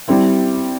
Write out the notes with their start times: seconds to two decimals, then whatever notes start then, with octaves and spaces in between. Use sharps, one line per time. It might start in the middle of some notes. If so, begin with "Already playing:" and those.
0.08 G3 C4 E4